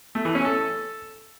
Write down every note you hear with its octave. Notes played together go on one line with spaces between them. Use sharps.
A3
E3
C#4
A4